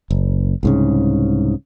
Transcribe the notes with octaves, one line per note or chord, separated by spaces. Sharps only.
F#1
C2 G#2 C#3